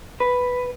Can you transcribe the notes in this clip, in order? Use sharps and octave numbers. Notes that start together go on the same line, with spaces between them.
B4